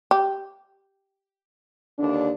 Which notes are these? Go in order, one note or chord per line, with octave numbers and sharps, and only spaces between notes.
G4
D#2 D3 D4